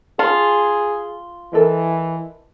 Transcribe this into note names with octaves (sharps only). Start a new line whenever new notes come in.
F4 G#4 A5
E3 A4 A#4 D#5